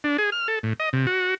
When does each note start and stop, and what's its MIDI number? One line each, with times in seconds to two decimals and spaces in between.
0.04 0.17 62
0.18 0.30 68
0.32 0.48 89
0.48 0.59 69
0.63 0.73 45
0.80 0.89 75
0.93 1.06 48
1.07 1.35 66